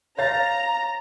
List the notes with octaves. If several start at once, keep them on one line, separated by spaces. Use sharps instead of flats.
C#5 F5 A#5 A6